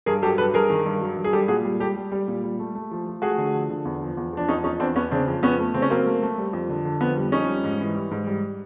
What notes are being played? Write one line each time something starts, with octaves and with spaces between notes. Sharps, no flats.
G2 G#4 A#4
F#3 G4 A4
G2 A4 B4
G2 G#4 A#4
D#3
G2
F#3
G2
G#4
G3 G4 A4
A#2 F#4 G#4
G3
G3 G4 A4
G3
G3
A#2
G3
A3
A3
F3
F3
A3 F#4 G#4
D3
F3
D3
E2
F3
E2
F3 D4
E2 C#4 D#4
F3 C#4 D#4
E2 C4 D4
E2 B3 C#4
C#3 C4 D4
F2
F2 B3 C#4
A3
C#3 C4
C#4
F#3 A#3 C4
A3
A3
G3
F2
D3
D3
F2 B3
G3
F2 C#4 D#4
G3
G#2
E3
G3
G#2
G3